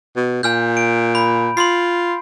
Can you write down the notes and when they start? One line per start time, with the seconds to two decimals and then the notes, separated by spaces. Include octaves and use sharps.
0.16 B2
0.43 A#2 G#5 F6 G6
0.77 D7
1.15 B5
1.57 F4 C6 C7